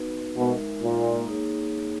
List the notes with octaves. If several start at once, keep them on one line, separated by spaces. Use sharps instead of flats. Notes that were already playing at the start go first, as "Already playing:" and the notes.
Already playing: B3 D#4 F#4 B4
B2 G#3 D#4 A#4 E5
A#2
A#3 D#4 G#4 C#5